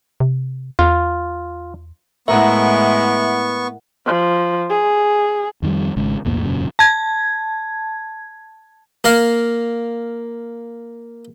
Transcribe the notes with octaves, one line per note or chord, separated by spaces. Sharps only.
C3
E2 F4
A2 G#3 B3 E4 A#4 E5 F#5 C#6
F3
G#4
F2 D#3 E3 G3
G#1 C#3 G#3
B1 E2 A2 A#3
E1 F#2 A#2 C#3
A5 G#6
A#3 A#4 F5